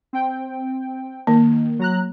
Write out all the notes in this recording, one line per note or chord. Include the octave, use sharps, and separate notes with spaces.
C4 G5
D#3 A#3
F#3 A#5 F#6